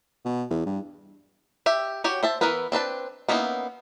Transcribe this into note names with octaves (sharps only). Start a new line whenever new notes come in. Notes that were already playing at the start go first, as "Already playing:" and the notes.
B2
E2
G2
G4 E5
F#4 G4 C#5
C5 E5 A5
E3 B3 E4 A#4 B4
C4 D4 B4 A5
A#3 B3 C#4 D#4 E4